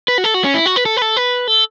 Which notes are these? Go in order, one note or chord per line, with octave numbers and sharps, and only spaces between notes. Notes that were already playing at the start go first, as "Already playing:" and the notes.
B4
F#4
A4
F#4
C#4
E4
F#4
B4
A4
B4
A4
B4
A4